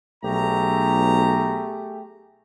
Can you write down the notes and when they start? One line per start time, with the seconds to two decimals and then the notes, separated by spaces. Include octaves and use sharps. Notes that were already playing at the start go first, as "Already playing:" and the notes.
0.24 B1 A3 G4 G#4 A#5